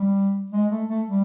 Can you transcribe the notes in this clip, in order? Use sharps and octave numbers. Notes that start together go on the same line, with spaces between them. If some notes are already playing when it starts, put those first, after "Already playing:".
Already playing: G3
G#3
A3
A3
G3